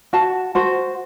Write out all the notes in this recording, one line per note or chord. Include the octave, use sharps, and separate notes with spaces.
F#4 A5
F#4 C5